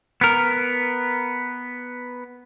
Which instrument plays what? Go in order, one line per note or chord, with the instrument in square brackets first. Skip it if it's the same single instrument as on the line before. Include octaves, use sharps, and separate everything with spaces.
[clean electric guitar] B3 A#4